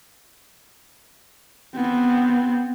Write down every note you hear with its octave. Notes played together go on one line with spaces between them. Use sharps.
B3 C4